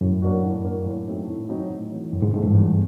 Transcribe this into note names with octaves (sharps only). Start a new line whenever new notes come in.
F#2 A2
F#3 A#3 D4 F#4
A2
F#3 A#3 D4 F#4
A2
F#3 A3 C4 D#4
A2
F#3 A3 C4 D#4
A2
E3 A3
F#2 A2
G#2
G#2 E3 A3
G2
E2